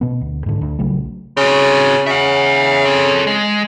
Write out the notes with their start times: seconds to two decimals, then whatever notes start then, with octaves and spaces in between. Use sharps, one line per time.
0.01 B2 B3
0.21 D2
0.46 G#2 D3
0.61 D2
0.79 A#1 C#3 F#3 A3
1.37 C#3 C4 F#4
2.06 C#3 E5 F#5
2.85 C4 A4
3.27 G#3